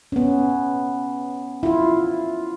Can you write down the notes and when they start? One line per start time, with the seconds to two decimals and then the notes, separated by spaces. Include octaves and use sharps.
0.12 B3 C#4
1.63 E4 F4